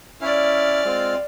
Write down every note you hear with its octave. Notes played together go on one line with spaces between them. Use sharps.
C#4 E4 D5 F5
G#3 C4 F4